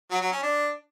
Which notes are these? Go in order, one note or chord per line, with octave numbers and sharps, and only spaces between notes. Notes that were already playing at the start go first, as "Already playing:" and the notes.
F#3
F#3
C#4
D4